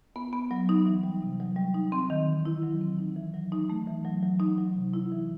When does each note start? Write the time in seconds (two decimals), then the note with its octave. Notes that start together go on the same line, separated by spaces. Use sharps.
0.16 B3
0.33 B3
0.51 F#3
0.69 D#4
0.86 E3
1.04 G3
1.22 C3
1.40 F#3
1.56 G3
1.74 D#4
1.92 C4
2.10 D#3
2.28 E3
2.45 E4
2.63 F#3
2.81 C4
2.98 D#4
3.16 E3
3.34 F#3
3.52 D#4
3.70 A3
3.87 E3
4.05 F#3
4.23 F#3
4.40 D#4
4.58 F#3
4.75 C3
4.94 E4
5.12 E3